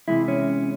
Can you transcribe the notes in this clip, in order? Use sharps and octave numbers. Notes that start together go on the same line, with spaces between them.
C3 E3 G#3 E4
C#4